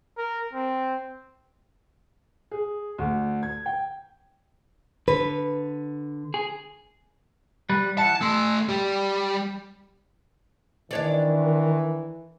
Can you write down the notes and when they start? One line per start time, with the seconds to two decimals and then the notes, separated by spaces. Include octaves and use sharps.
0.18 A#4
0.53 C4
2.51 G#4
2.98 D2
3.43 G#6
3.66 G5
5.08 D3 B4
6.34 G#4
7.69 G3 B4
7.98 E3 F#5 A5
8.21 A3 C6 E6
8.68 G3 G4
10.91 D#3 E3 D4 C#5 D5